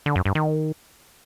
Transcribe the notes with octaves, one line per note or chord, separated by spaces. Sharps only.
D3
F#2
G2
D#3